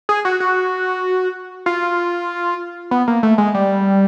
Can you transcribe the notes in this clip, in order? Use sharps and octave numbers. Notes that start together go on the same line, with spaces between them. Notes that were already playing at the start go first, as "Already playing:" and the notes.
G#4
F#4
F#4
F4
B3
A#3
A3
G#3
G3